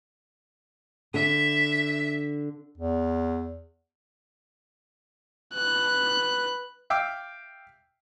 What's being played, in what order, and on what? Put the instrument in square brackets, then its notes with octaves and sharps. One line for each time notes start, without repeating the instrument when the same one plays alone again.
[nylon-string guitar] D3 [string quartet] E5
[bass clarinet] E2
[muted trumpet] B4 [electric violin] F#6
[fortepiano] E5 F5 G5 D6 E6